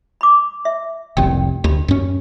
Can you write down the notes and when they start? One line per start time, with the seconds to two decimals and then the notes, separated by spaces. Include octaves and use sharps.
0.21 B5 D6
0.65 E5
1.17 F1 C2 C#4 G4 G5
1.64 D2 G4 B5
1.88 F#2 C#4